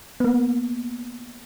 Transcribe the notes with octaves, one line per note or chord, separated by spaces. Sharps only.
A#3 B3